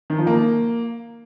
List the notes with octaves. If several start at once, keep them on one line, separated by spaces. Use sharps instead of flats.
D#3
F3
A#3